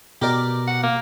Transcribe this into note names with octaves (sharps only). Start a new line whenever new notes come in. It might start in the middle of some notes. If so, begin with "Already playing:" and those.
B2 G4 A#4 D5
F#5
A#3